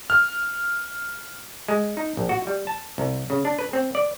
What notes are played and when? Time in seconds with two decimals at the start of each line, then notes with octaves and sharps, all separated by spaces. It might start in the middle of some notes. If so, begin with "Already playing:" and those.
0.10 F6
1.68 G#3
1.97 D#4
2.17 A#1
2.29 F#4
2.47 G3
2.67 A5
2.98 C2
3.30 C#3
3.45 D4
3.59 B4
3.73 C4
3.95 D5